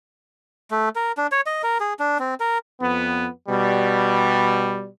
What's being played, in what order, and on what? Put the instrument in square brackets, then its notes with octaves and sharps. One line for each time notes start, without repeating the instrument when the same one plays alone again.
[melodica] A3
A#4
D4
C#5
D#5
A#4
G#4
D4
C4
A#4
[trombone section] F2 B3
B2 G3